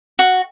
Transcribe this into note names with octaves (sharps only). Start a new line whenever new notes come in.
F#4